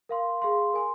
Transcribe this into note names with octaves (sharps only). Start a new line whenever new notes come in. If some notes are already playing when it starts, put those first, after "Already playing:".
A#4 F5 C6
G#4 F5 C6
A#4 G#5 C6